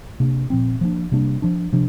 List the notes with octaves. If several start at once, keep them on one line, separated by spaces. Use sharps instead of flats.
C3 A#3 D4
A#2 F3 C4
F3 A#3 D4
C3 G3 A#3 D4
F3 D4
C3 F3 D4